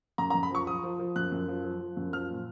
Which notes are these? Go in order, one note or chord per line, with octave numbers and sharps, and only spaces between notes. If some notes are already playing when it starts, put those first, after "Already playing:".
F#2 A#5
A#5
F#2
B5
F3 C#6
F3 D#6
F3
F3
F#2 F#6
F#2
F3
F3
F3
F#2
F3 F6
A#2